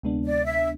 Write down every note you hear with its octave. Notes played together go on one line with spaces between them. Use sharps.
D2 C3 G#3 B3 D4
D5
E5